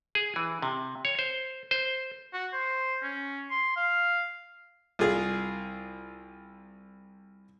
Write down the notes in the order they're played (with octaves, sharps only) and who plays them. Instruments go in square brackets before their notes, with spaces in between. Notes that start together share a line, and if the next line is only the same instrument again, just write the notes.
[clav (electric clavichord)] G#4
E3
C3
C#5
C5
C5
[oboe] F#4
C5
C#4
C6
F5
[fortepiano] C2 F4 G#4 F5